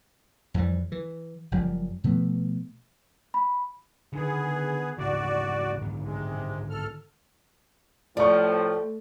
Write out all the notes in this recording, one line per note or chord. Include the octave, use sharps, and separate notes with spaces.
F2 E3 G3
E3
F#1 F#2 F3 G3
B2 F3 A3 B3
B5
D3 D#3 B3 G#4
G#2 C#3 E3 F#4 D5
G#2 D3 D#3
C3 G#3
A4 F6
A2 C3 F3 A3 D5 C#6